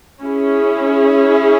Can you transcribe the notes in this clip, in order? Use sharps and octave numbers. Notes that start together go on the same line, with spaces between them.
C#4 E4 G#4